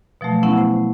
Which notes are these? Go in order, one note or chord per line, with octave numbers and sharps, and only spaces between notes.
B2 F3 F#3 A3
B3 C#4 E4 F#5
C5